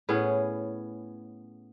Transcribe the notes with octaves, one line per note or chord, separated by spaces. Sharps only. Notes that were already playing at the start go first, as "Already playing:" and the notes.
A2 B3 C#4 G#4